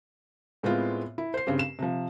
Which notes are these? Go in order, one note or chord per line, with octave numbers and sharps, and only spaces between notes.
A2 G#3 B3 C4 F4
E4
C5 C7
G2 C#3 C4 G4
E7
C3 F3